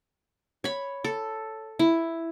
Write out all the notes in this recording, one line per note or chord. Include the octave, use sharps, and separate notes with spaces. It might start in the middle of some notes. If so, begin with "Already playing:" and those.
C#5 B5
A4
E4